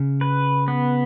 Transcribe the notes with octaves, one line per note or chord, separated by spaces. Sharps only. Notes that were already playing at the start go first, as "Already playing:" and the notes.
Already playing: C#3
B4
B3